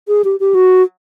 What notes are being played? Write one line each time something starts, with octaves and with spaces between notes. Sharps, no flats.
G#4
G4
G4
F#4